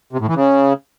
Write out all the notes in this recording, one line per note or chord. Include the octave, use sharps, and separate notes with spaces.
C3
A2
E3
C#3